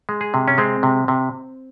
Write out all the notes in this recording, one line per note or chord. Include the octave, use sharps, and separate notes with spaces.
G#3
G#4
C3
C#4
G#3 C4
C3
C3